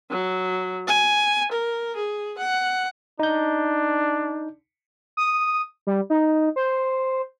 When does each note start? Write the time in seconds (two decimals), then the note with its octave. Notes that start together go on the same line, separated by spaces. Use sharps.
0.10 F#3
0.87 G#5
1.51 A#4
1.95 G#4
2.38 F#5
3.20 D4 D#4 G6
5.17 D#6
5.87 G3
6.10 D#4
6.56 C5